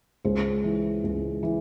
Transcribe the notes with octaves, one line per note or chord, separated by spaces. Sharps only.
C#2 C5
E3
C#2
E3